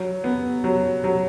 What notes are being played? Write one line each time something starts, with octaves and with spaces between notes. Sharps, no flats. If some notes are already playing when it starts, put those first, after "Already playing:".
Already playing: F#3
B3
F#3
F#3